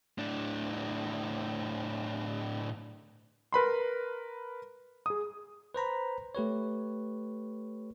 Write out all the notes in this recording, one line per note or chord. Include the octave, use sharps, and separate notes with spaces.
A2 D4
A#4 B4 B5 C6
G#4 D#6
B4 C5 A#5 B5
A3 G4 B4 C#5